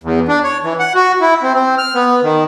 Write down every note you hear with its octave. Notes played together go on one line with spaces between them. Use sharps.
E2
D4
C#5
E3
F#5
F#4
E4
C4
C4
F6
B3
D#3